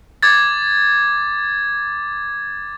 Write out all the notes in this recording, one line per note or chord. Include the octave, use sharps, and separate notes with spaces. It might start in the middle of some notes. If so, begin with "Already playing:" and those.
D6 G#6 A6